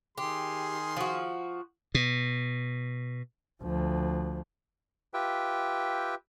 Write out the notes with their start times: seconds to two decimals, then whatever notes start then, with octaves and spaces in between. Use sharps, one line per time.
0.18 D#3 G4 G#4 C6
0.97 F3 F#4
1.95 B2
3.63 D2 F3
5.14 F4 G4 B4 E5 G5